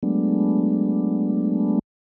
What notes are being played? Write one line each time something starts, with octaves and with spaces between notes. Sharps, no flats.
F#3 G#3 A3 B3 D4